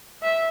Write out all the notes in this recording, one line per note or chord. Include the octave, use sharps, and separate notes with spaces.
E5